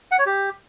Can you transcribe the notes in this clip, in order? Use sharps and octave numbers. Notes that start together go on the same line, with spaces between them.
F#5
C#5
G4